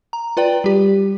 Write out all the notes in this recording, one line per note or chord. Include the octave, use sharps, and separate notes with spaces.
A#5
F4 B4 D5 G5
G3 G4